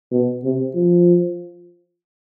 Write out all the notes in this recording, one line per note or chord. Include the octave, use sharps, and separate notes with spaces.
B2
C3
F3